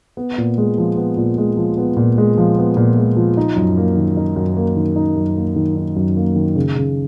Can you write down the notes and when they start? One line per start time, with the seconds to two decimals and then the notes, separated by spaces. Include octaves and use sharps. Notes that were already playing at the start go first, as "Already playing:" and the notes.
0.17 B3
0.38 A#2
0.58 G#3
0.78 F3
0.97 B3
1.17 A#2
1.38 G#3
1.57 F3
1.78 B3
1.97 A#2
2.18 G#3
2.38 F3
2.58 B3
2.77 A#2
2.97 G#3
3.17 F3
3.37 D#4
3.56 F#2
3.77 A#3
3.97 D#3
4.17 D#4
4.36 F#2
4.57 A#3
4.76 D#3
4.96 D#4
5.16 F#2
5.37 A#3
5.56 D#3
5.76 D#4
5.96 F#2
6.17 A#3
6.36 D#3
6.56 C#3
6.76 C#3